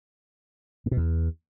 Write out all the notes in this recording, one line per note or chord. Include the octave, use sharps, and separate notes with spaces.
A2
B2
E2